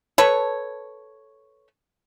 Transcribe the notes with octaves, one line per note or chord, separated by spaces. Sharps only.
A4 B4 C#5